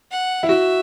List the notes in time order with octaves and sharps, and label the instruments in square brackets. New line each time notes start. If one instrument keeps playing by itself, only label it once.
[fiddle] F#5
[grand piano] E4
[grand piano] F#4 [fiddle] E5